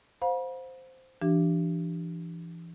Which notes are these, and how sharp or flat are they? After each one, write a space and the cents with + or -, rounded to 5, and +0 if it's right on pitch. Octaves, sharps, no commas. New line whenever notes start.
C5 -5 F5 +40 B5 -40
E3 +35 D4 +0 G4 -25